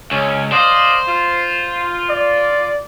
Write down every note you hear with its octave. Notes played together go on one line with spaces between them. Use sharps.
C#2 C#4
C5 D5 D#5 F5
F4
D5